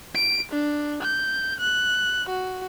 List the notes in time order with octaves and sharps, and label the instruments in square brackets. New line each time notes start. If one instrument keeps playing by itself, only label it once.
[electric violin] D7
D4
G6
F#6
F#4